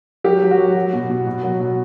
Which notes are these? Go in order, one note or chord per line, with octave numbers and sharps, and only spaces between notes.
F#3 G4
F#3
F#4
F#3
F#3
B2
B2
B2
F#3
B2